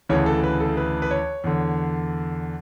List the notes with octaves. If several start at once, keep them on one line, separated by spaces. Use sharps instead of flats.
D2 C#3 E3 C#5
A4
B4
A4
B4
B4
C#5
E2 D3